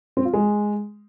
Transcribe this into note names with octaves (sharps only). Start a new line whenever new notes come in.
C4
F4
G#3